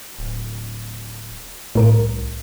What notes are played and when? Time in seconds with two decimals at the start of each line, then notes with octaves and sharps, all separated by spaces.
0.19 D1
1.75 C2 A2 A#4 D7